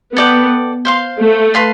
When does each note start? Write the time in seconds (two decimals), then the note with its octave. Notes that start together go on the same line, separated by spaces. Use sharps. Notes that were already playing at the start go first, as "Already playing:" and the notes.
0.15 B3 A4 D5 G5
0.85 C5 F5 C6
1.20 A3
1.54 B4 F5 A5 C6